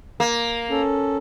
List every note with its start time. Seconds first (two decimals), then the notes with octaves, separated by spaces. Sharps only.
0.20 A#3
0.70 C#4 A4